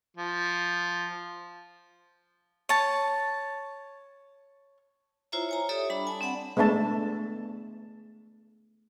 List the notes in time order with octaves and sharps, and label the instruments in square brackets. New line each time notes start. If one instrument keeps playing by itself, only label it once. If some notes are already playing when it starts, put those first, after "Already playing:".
[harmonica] F3
[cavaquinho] C#5 A5
[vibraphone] E4 F4 C5 C#5 E5 A#5
C#5 G#5 A#5
G4 A4 C#5 D5 E5 D#6
G3 D4 B5
G#5 A5
C4 D5 F#5 B5
[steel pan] G#3 A3 B3 D4 A5